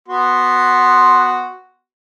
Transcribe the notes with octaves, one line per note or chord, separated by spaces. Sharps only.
B3 F#4 C6